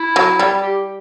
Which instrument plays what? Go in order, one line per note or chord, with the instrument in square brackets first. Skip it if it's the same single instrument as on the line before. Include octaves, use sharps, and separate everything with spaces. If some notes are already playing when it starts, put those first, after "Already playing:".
Already playing: [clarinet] E4
[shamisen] F#3
G3
[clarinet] G4